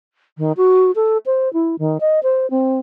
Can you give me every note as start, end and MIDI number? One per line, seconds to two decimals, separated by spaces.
0.38 0.53 51
0.57 0.91 66
0.96 1.18 69
1.26 1.52 72
1.53 1.76 64
1.79 1.98 51
2.01 2.20 75
2.23 2.49 72
2.50 2.80 60